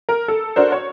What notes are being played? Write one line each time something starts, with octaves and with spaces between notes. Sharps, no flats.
A#4
A4
D4 F#4 A#4 C5
C#5